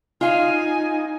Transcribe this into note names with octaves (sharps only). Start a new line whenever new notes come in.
D#4 F4 F5 G#5